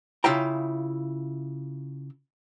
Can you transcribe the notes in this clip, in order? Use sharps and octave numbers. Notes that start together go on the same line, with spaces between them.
C#3 E4 F4 E5 G5 A#5